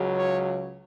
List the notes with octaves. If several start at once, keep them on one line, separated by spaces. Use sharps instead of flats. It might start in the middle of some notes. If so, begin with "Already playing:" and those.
Already playing: C#2 C#3 F#3
C#5